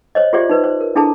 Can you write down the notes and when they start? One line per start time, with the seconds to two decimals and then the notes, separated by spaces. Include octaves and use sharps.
0.15 C5 C#5 D#5
0.33 F4 G4 G#4 C5 D5 E5
0.49 D#4 B4 C5
0.64 C5
0.81 A#4
0.95 D4 E4 G#4 A4 A5 A#5